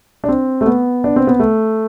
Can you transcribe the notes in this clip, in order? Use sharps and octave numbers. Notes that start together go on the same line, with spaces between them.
D4
C4
A3
B3
D4
C4
B3
A3